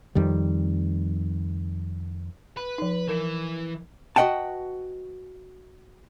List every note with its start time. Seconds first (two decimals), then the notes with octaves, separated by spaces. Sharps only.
0.15 F2 D#3 G3
2.57 B4
2.78 F3 D#4
3.09 E3 A#4
4.16 F#4 B4 D#5 F#5 G5 A5